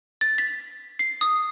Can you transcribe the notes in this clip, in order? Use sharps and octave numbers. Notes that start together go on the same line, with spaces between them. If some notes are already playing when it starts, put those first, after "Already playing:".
A6
B6
C7
D#6